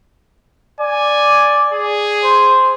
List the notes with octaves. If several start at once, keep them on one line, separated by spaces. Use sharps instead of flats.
D5 G#5
G#4
C5